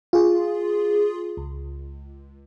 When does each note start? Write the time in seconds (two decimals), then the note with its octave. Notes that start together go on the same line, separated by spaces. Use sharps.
0.13 F4 G#4
1.37 C#2